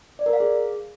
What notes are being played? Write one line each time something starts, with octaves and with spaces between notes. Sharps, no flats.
D5
A#4
F5
G#4